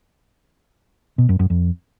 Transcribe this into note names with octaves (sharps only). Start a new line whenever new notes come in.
B2
F#2
F#2
F2